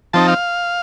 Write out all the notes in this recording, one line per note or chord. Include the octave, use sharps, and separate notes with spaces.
F3 C4 D#4 A5
F5